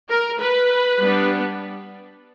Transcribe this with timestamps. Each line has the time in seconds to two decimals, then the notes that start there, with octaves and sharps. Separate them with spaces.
0.09 A#4
0.39 B4
0.99 G3 B3 D4